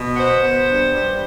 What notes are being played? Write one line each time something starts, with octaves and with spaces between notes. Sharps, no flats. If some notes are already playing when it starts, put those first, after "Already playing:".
Already playing: B2
B3 C5
B3
G2
G3